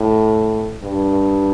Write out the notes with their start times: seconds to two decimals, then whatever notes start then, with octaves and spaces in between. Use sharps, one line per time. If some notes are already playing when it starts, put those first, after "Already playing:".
Already playing: A2
0.83 G2